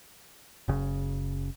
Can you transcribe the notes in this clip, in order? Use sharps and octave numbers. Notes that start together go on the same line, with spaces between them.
F#1 C#3